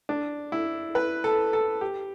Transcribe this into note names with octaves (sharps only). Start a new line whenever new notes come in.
D4
E4
B4
A4
A4
G4